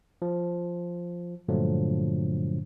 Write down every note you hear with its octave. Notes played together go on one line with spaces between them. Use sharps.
F3
G2 A#2 D3 F3 F#3 A3